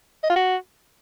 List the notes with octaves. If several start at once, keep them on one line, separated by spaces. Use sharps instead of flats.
D#5
F4
F#4